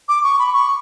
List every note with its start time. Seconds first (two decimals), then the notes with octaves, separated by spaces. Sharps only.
0.08 D6
0.23 C#6
0.39 B5
0.53 C#6